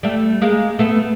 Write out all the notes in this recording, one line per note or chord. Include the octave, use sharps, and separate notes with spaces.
G3 A3
G#3 A#3
A3 B3